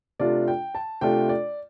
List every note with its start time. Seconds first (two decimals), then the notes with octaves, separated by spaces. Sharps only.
0.20 C3 A3 D4 F4 D5
0.48 G5
0.75 A5
1.01 C3 A3 D4 F4 G5
1.29 D5